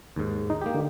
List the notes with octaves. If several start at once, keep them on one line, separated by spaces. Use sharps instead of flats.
D#2 G#2
D#4
A#3 G4
D3